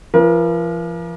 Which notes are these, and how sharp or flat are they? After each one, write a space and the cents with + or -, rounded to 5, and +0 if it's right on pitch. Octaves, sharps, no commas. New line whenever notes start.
F3 -40 A#4 +35